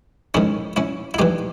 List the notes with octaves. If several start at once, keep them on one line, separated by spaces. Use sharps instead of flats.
G#2 D#3 C#4 E4
C#4 E4
E4
G2 E3 D#4 G4